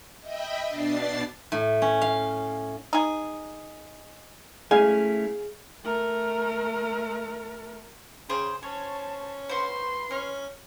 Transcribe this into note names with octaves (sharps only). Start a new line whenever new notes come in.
D#5 E5 G5 B5
B2 D4 A6 C7
A2
C#4
F5
D#4 G#4
A3 C#4 E4 G#4 F5 G#5
A3 A#4
C#3 G#4 C5 G5
C#4 C5 C#5 A5
F#4 B4 C5 C6
C#4 F6